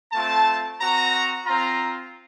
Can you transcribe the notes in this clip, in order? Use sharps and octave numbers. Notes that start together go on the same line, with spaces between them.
A3 C4 F4 A5
C4 F#4 A#5
C4 F4 A#5